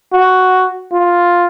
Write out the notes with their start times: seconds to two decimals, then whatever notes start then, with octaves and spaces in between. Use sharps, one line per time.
0.13 F#4
0.92 F4